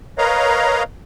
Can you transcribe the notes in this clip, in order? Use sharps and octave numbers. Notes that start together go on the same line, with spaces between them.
A#4 B4 C#5 D#5 F5 A#5